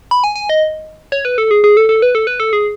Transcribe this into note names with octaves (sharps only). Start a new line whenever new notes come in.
B5
G#5
G#5
D#5
C#5
B4
A4
G#4
G#4
A4
A4
B4
A4
B4
A4
G#4